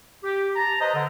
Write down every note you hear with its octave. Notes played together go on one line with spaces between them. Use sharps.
G4
A5 A#5
B4 C5 D#5
D3